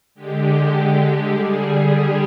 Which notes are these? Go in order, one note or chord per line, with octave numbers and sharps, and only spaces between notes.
D3 G#3 G4
D3 G3 G#4
G4